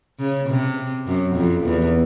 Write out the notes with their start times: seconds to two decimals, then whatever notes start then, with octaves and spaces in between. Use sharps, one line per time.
0.20 C#3
0.49 C3
1.07 F#2
1.36 F2
1.65 E2